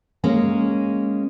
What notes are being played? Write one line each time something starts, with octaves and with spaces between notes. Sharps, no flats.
G#3 A#3 C#4